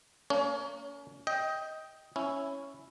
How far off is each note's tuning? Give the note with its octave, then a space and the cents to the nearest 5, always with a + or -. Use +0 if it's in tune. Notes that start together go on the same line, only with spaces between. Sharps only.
A#3 -25 C#4 +35 C#5 +20
D#5 +15 G5 +0
C#4 +0 E4 +0